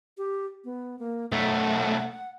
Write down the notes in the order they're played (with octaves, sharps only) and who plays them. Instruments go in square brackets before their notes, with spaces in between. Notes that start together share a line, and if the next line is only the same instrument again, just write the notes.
[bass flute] G4
B3
A#3
[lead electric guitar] B1 A3 [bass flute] F#5